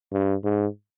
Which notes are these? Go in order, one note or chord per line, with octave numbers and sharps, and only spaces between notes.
G2
G#2